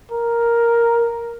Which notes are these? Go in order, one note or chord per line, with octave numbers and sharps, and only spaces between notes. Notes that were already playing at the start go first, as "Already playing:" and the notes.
A#4